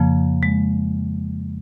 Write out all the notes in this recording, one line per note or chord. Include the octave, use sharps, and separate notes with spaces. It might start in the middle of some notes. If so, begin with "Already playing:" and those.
Already playing: F2 C#3 F3 A#3
G#3